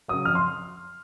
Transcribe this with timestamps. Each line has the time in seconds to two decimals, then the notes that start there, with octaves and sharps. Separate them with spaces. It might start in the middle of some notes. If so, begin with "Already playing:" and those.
0.08 C#3 F#3 D#6
0.25 F2 F6
0.35 C6